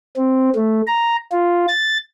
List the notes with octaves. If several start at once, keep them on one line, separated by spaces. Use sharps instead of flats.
C4
A3
A#5
F4
A6